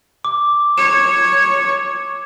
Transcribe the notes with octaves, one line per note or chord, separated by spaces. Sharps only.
D6
C#5 E7